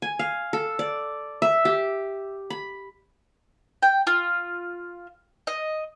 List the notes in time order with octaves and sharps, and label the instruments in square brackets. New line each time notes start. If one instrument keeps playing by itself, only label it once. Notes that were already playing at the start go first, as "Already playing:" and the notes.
[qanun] G#5
F5
A4
D5
E5
G4
B5
[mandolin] G5
F4
D#5